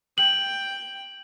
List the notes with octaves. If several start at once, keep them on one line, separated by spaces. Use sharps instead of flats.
G5 F#7